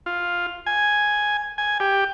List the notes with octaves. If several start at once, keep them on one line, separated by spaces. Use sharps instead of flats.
F4
G#5
G#5
G4